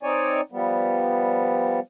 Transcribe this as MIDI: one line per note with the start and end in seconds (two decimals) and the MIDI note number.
0.03 0.41 60
0.03 0.41 63
0.03 0.41 73
0.03 0.41 74
0.03 0.41 80
0.52 1.80 53
0.52 1.80 55
0.52 1.80 59